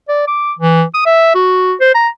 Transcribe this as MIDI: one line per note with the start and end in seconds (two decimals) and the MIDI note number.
0.09 0.27 74
0.28 0.52 86
0.59 0.84 52
0.95 1.02 87
1.06 1.35 76
1.35 1.74 66
1.81 1.93 72
1.95 2.08 82